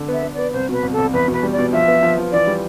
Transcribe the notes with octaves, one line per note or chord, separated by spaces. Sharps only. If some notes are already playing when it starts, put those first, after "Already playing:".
Already playing: D3
B3 E5
B3
B3 D5
C2 C5
B2 B4
C2
A4
C2
E2 B4
B2 B4
G3
D5
B2
F3 E5
B3
F3
F3
E3 D5
G3